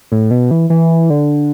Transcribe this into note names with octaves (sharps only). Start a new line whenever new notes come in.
A2
B2
E3
E3
D3